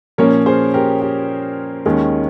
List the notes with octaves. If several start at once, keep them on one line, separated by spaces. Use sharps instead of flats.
A#2 F3 A#3 C#4 A#4 C#5
G#4 C5
G4 A#4
G4
D#2 D#3 G#3 C#4